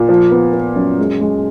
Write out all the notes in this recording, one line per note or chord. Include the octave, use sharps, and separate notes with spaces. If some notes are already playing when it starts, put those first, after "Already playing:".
Already playing: A#2
F3
B3
B3
F#2
G#3
G#3